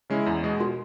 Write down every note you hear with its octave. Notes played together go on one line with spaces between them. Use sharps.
C#3 G#3 C#4 E4
E2
B2 G#3
F#4